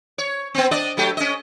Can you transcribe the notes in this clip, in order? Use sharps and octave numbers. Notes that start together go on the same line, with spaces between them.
C#5
B3 C4
D4 D5 D#5
F#3 A3 G4
C#4 D#5